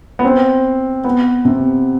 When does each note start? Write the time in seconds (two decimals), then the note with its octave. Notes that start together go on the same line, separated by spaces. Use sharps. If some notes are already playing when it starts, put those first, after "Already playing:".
0.19 B3
0.25 C4
1.04 B3
1.45 C3